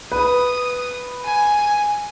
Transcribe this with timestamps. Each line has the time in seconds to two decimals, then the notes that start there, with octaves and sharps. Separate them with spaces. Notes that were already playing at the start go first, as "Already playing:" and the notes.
0.12 B4 D#6
1.24 G#5